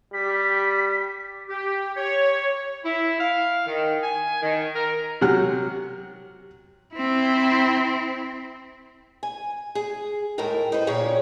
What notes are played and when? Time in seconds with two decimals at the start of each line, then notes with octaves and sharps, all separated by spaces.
0.14 G3 G4 B6
1.49 G4
1.96 C#5
2.84 E4
3.20 F5
3.67 D#3
4.03 G#5
4.42 D#3
4.76 A#4
5.21 C3 F#3 F#5 F6
6.95 C4 E4
9.23 G#5
9.75 G#4
10.38 D#2 A2 G#3 A4 A#4 G5
10.72 D#4 B4 C5
10.87 A#2 D3 C#4 G#4 C#5 G5